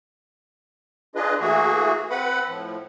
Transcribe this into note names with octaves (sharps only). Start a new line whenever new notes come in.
D4 F4 G#4 B4 D#5
E3 A3 A#3 F#4 G#4
C4 B4 F#5 B5
A2 F3